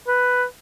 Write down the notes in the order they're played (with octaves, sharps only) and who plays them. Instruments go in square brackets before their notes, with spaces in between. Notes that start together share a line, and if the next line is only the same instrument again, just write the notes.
[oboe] B4